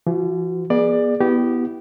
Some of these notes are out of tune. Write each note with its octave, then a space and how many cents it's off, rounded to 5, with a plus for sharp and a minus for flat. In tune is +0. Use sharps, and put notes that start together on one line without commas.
F3 -45 F#4 +0
B3 -40 G#4 -5 D5 +15
B3 +0 E4 +0 G4 -20